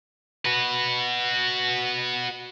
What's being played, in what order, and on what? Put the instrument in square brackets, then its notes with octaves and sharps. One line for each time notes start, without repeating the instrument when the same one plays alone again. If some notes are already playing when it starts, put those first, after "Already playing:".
[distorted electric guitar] F#4 B4